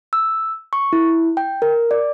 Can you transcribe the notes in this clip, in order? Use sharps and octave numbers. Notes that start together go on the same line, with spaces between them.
E6
C#6
E4
G5
A#4
D5